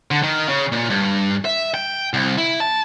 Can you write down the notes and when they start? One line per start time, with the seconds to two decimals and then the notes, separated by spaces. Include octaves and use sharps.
0.11 D3
0.23 D#3
0.49 C#3
0.72 A#2
0.90 G2
1.45 E5
1.74 G5
2.14 C2
2.38 E4
2.60 A5